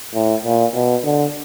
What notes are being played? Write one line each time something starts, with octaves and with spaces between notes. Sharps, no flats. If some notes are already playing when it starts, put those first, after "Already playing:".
A2
A#2
B2
D3